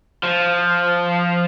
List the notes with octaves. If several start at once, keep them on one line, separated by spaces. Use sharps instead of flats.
F3